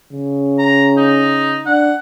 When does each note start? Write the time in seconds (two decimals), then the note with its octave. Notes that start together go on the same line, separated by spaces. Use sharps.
0.12 C#3
0.59 A#5
0.97 D#4
1.66 D4 F#5